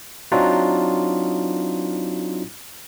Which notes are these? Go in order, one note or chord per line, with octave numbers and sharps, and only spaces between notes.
F#3 C4 D4 D#4 F4 F#4